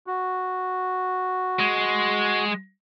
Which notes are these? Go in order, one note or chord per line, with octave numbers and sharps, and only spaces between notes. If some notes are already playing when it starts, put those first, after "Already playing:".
F#4
G#3